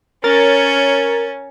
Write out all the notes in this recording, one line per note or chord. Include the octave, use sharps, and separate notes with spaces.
C#4 A#4 C#5 A6